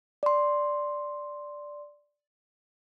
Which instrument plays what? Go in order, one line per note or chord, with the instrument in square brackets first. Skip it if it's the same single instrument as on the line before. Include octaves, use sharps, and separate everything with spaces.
[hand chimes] D5 C6